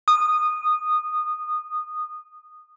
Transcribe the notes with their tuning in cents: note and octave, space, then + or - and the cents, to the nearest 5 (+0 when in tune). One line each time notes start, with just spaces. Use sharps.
D#6 -15